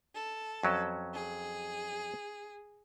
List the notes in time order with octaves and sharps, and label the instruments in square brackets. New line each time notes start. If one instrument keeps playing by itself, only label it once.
[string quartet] A4
[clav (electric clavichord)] F2 F#3 C#4
[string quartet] G#4